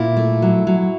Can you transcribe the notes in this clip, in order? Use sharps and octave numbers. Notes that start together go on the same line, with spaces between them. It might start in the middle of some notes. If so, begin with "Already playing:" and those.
Already playing: A#2 E4
A3
F#3
F#3